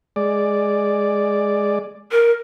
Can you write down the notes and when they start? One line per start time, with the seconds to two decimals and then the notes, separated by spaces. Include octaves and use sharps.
0.16 G#3 D5
2.11 A#4